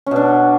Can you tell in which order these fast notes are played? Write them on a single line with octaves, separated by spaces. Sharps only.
C#4 B2 D4